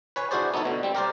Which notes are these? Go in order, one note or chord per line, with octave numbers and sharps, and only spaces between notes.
B4 C#5 G#5
D4 E4 F#4 G#4 C5 D5
B3 D#4 E4 A4 C#5
B2 D3
G3 C4
G4 A#4 C5 D5